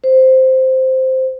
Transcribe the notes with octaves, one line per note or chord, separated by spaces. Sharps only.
C5